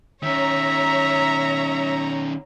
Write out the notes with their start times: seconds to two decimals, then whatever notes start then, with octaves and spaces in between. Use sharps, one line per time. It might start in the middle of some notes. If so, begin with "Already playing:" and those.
0.23 D#3 C#4 C#5 E5 A#5